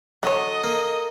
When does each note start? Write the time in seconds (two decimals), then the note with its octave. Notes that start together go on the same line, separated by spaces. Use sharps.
0.23 D3 F#3 A4 C#5 D#5
0.64 A#3